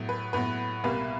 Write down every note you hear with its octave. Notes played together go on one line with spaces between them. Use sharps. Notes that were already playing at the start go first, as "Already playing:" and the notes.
Already playing: A2 F#3 B3
B4
A2 F#3 B3 B4
C2 B2 G3 A#3 B4